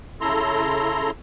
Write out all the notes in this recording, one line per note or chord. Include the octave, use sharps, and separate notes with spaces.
C#3 E4 A4 A#5 C6